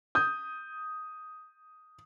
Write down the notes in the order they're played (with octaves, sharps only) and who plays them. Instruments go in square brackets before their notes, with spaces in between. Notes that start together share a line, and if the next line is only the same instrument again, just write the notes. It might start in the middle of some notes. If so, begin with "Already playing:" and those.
[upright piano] D#6 G6